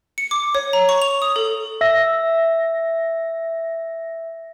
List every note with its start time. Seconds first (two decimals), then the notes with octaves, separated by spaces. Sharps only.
0.18 C#7
0.31 D6
0.55 C#5
0.73 A#5
0.89 C#6
1.02 F7
1.22 D#6
1.36 A4
1.81 E5 A#6